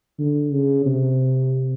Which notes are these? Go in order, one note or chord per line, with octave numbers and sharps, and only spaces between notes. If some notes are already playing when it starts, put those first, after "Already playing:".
D3
C#3
C3